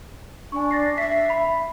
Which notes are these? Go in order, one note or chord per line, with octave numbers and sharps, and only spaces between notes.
D4 G#5 C#6
A6 A#6 C7
E5 B6 C7
B5